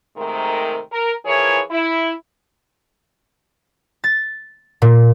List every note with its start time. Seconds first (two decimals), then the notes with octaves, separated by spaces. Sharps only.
0.17 G#2 C3 D#3 A3 A#4
0.91 A#4
1.25 E3 F3 E4 G#4 A#4 C#5
1.71 E4
4.04 A6
4.82 A#2